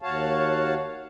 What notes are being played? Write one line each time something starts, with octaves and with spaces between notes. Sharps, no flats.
D#2 F#4 C#5 F5 A5